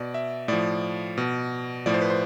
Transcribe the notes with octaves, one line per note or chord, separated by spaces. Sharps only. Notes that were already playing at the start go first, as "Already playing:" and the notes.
Already playing: B2 D5
E5
A2 F3 D5
B2
A2 F3 D5
C5
B4
C5